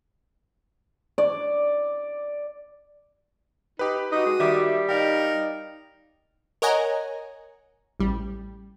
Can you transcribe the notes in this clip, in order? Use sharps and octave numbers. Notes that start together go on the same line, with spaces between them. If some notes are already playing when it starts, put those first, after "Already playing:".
D5
D#4 G4 B4
D#4 F#4 D#6
G#3
D#3 G3 E5 D6
D#4 A#4 D5 F5 G5
A#4 C#5 D#5 F#5 G#5 A#5
A1 G3